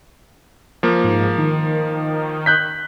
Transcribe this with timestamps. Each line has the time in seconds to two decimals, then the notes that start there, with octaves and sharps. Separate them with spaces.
0.83 F3 A#3
1.04 G#2
1.38 D#3
2.46 F#6 G6 B6